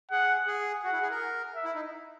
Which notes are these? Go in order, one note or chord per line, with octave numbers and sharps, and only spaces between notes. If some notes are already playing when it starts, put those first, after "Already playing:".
G#4 F#5
G#4
F#4 F#5
E4
G#4
A#4
E5
E4
D#4